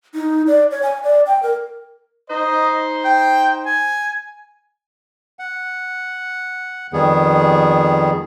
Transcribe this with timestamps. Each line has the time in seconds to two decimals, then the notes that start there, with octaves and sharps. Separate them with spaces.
0.14 D#4
0.47 D5
0.71 C#5
0.83 G#5
1.04 D5
1.27 G5
1.43 A#4
2.30 D#4 C5 D#5
3.05 G5
3.66 G#5
5.39 F#5
6.93 F2 D#3 G3 B3 G#4